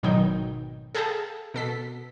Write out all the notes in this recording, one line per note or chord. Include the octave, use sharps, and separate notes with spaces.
G#1 B2 D#3 F#3 D#4 G5
G#4 A4 F5 G5 A5 A#5
B2 A4 B6